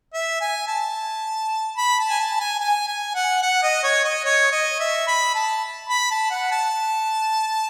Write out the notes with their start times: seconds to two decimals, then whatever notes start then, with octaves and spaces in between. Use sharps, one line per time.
0.14 E5
0.41 G#5
0.68 A5
1.78 B5
1.99 A5
2.09 G#5
2.19 A5
2.40 G#5
2.60 G#5
2.88 G#5
3.15 F#5
3.42 F#5
3.63 D#5
3.84 C#5
4.04 D#5
4.25 C#5
4.52 D#5
4.80 E5
5.07 B5
5.35 A5
5.89 B5
6.11 A5
6.30 F#5
6.51 A5